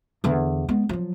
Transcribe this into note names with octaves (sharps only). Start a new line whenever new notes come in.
E2 D3
G#3 B3
F3 F#3